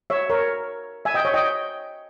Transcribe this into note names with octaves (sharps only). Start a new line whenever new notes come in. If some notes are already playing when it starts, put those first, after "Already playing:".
C#5 E5
A#4 C#5
E5 G#5
D#5 G5
C#5 E5
D#5 G5